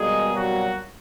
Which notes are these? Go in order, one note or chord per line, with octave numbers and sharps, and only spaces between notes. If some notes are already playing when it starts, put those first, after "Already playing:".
Already playing: B2 G3 G#3 A#3 G#4
F#3 F#4